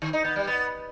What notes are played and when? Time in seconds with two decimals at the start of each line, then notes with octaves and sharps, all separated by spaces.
0.02 D#3
0.13 D#4
0.25 B3
0.36 G3
0.47 B3